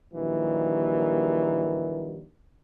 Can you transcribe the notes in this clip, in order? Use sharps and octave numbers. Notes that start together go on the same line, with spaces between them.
A#1 D#2 D#3 E3 F#3 G3